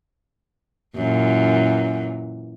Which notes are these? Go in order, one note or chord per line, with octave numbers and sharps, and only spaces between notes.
F#2 A#2 E3